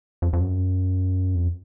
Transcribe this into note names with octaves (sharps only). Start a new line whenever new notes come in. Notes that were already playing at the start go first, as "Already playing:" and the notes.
F2
F2
F#2
F2